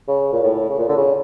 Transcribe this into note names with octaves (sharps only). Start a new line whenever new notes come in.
C#3
A#2
A2
C#3
A#2
D3
C#3